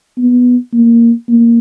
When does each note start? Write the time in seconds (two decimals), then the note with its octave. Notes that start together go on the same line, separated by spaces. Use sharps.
0.18 B3
0.73 A#3
1.28 A#3